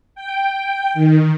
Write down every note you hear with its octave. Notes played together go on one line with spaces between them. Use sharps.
G5
D#3